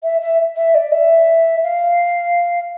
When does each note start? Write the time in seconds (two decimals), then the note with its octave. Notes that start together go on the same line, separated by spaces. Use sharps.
0.03 E5
0.21 E5
0.56 E5
0.74 D5
0.92 E5
1.64 F5